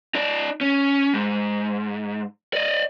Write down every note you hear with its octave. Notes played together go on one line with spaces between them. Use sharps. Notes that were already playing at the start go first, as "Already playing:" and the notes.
D#4 D5
C#4
G#2
D5 D#5